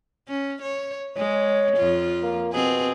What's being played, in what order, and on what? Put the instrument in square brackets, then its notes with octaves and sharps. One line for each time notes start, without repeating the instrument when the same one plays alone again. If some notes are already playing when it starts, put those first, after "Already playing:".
[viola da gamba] C#4
C#5
[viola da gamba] G#3 [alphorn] C#5
[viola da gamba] F2 F4
[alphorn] A#3
[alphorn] B2 [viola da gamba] C4 G#4